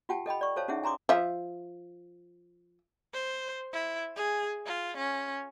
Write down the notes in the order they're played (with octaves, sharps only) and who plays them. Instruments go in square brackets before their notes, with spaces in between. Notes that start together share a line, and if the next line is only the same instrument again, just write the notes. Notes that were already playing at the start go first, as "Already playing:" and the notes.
[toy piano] F4 G4 F#5 G5 A5
A4 D#5 G5 B5
D5 C#6
A4 A#4 C5 C#5 F5 A5
C#4 D#4 E4 G#4 E5 F#5
G#5 A#5 C6 D6 D#6
[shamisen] F3 E5
[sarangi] C5
E4
G#4
F4
C#4